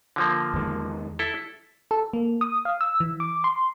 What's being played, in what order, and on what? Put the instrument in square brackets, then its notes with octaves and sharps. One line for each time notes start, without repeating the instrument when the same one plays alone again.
[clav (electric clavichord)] D3 F3 A#3
[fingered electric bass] E2 D#3 G#3
[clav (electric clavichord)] E4 A4
[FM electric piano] A4
A#3
D#6
F5
E6
E3
D6
C6